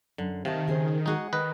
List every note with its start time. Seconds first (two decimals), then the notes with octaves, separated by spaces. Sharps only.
0.18 F#2 D3
0.45 C3 D#3 F5 A5
0.67 C#3 G#4 C5
1.06 G#3 D#4 F#4 G#4 F#5
1.33 D#3 B4 D#5